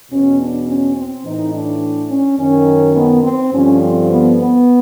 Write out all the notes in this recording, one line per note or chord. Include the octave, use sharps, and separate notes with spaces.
E2 B2 C#4
D4
C#4
C4
A2 E3 D#4
D4
C#4
F#2 D#3 C#4
B3
C4
G2 D3 F3 C#4
C4
B3
B3